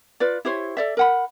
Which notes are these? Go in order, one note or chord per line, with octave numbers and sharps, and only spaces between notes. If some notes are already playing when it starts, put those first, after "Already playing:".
F4 B4 D5
E4 G4 C5 C#5
A4 D5 E5
A#4 F#5 B5